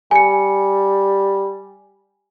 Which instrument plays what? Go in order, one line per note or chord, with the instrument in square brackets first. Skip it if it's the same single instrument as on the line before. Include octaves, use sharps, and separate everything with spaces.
[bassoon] G3 [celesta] G#5 C#7